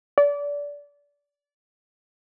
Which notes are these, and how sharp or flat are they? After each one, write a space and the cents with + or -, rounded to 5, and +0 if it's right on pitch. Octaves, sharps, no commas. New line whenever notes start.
D5 -25